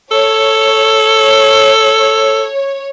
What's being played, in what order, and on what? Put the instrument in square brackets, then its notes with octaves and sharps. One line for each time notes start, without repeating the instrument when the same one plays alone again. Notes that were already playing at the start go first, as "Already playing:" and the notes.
[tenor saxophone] A4 [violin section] C#5